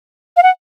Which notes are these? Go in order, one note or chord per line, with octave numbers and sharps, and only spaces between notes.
F5
F#5